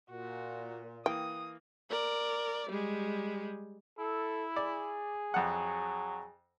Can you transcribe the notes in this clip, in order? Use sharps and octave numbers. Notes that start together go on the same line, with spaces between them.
A#2 F#4
E3 A#3 G5 D#6
A#4 D5
G3 G#3
E4 A4
G#4 D5
F2 F#3 F#5